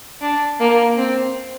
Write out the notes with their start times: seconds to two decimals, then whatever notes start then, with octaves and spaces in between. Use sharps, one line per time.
0.21 D4
0.60 A#3
0.98 C4